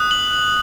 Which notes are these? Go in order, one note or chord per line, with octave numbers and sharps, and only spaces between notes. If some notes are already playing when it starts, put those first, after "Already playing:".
Already playing: D#6 F#6
F#7